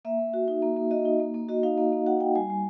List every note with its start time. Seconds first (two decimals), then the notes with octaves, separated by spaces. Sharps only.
0.05 A#3 E5
0.19 A#3
0.34 F#4
0.48 D#4
0.62 A#3
0.77 A#3
0.91 F#4 D#5
1.05 D#4
1.20 A#3
1.34 A#3
1.49 F#4 D#5
1.63 D#4 F5
1.78 A#3
1.92 A#3
2.06 F#4 F#5
2.20 D#4 G5
2.35 G3 G#5
2.50 G3